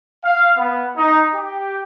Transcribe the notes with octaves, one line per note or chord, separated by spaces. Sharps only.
F5
B3
D#4
G4